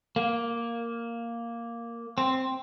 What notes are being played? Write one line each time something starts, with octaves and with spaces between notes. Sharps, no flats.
A#3
C4